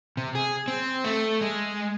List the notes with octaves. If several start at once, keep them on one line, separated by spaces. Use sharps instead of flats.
C3
G#4
C4
A3
G#3